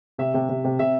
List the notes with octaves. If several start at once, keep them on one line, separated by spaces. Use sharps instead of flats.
C3 E5
C3
C3
C3
C3 E5